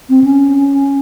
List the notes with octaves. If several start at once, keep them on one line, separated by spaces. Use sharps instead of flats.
C4
C#4